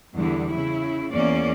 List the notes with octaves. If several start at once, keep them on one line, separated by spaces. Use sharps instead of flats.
E2 D3 G3 E4
C#3 E4
E2 A#3 C#4 D5